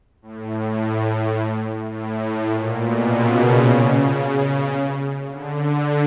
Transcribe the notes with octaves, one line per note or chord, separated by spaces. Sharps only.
A2
A2
A2
A#2
B2
C#3
D3